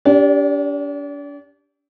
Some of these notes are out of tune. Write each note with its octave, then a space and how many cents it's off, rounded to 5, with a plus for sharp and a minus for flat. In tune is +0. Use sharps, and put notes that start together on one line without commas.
D4 -40 G4 +0 D5 +0